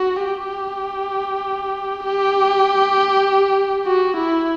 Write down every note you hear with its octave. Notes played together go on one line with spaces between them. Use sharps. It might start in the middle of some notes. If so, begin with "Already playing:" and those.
Already playing: F#4
G4
G4
F#4
E4